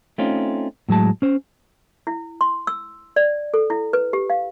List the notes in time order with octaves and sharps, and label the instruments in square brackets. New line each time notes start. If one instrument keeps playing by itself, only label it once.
[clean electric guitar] A3 C4 C#4 D#4 F4
A2 F#3 G#3 A5
C#4 C5
[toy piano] E4
C6
E6
D5
A4
E4
B4
G4
F5